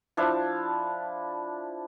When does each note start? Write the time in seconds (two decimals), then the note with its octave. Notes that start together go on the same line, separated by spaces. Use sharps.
0.17 F3 D4 E4 F5